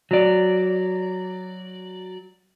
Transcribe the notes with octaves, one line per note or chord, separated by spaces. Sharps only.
F#3 D5